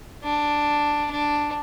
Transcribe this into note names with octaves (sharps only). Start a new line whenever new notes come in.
D4
D4